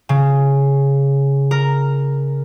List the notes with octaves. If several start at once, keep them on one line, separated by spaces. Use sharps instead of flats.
C#3
A#4